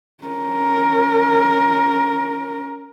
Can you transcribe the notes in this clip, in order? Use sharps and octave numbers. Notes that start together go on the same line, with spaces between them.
C#4 A#4